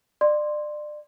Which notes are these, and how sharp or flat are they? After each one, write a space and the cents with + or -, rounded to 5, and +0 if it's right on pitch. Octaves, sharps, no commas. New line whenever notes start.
D5 +30 C6 +0